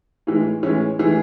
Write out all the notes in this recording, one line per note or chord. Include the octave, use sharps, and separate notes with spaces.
A2 E3 G#3
A2 E3 G#3 C#4
A2 E3 G#3 G#4